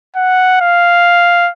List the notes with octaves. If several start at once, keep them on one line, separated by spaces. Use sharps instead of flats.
F#5
F5